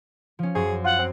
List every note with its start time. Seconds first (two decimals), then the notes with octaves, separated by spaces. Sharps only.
0.39 F3 C#4
0.55 F#2 G#4 C5 C#6
0.84 F4 F#5
0.99 C4